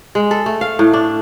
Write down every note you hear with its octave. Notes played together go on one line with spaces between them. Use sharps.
G#3
A4
A3
F5
A2
D4